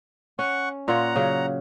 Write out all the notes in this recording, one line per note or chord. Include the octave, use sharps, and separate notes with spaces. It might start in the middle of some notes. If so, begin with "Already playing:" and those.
C#4 F#5 C#6
A#2 F4 C#5 F#5 A#5
C#3 F#3